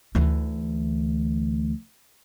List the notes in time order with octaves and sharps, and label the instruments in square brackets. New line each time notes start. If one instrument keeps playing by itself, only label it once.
[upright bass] D2 E3